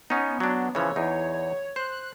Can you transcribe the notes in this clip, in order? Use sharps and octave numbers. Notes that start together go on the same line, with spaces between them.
B3 C#4 D#4
F#3 D4
C#3 E3 F3 C#5
E2 D#4
C5 F#6